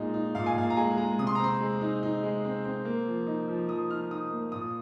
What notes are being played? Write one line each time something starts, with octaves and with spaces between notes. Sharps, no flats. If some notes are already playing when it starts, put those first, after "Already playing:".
Already playing: A#2 G#3 D#4
D#4
A#2 F5
G#5
A#2 F5
A#5
G#3 G#5
G#3 A#5
C3 D#6
C6
A#5
C4 C6
G#3
D#4
D#4
G#3
C4
C4
A#3
F3
D#4
F3
F3 D#6
D#4 F6
D#4 D#6
A#3
A#2 D#6